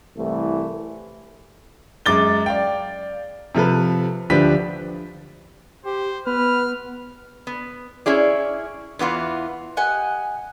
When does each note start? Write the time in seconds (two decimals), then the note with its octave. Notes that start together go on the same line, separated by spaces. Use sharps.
0.17 C2 E3 A3
2.06 F#2 G#3 D6 A6 G7
2.46 D5 F5 G5
3.55 C3 F3 A4 B4
4.30 D2 F3 D4 G4 B4 B6
5.85 G4 C5
6.27 B3 B4 F6
7.47 B3
8.06 C#4 E4 G#4 D5
8.99 E2 E3 B3 F4
9.77 G4 D#5 F#5 G#5